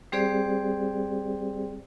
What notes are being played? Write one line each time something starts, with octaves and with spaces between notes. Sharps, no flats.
G3 C4 G4 G#4 C5 D5